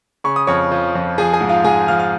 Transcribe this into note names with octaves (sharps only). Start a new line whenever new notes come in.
C#3 C#6
D#6
F2 C#5 C#6
F3
F2
F3 G#4 G#5
G#4 G#5
G#2
F4 F5
G#2 G#4 G#5
F3 F5 F6
F5 F6